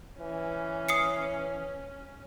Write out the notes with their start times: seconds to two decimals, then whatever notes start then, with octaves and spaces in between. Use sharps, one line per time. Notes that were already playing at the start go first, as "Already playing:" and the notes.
0.19 E3 C#4
0.89 D#6 C7 C#7